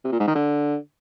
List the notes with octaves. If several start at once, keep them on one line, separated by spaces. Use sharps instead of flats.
C3
A#2
G#2
D#3
D3